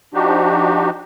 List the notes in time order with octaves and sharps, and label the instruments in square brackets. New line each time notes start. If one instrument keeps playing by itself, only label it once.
[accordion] F3 D4 D#4 F#4 G4